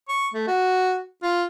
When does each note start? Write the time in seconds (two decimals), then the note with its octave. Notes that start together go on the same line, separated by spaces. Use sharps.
0.09 C#6
0.34 A3
0.47 F#4
1.23 F4